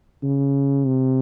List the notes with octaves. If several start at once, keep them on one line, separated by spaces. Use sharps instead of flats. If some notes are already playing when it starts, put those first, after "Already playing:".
C#3
C3